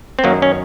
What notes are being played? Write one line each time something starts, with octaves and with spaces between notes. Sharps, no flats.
C4
F#2 D#3 F#3 A#3
C#4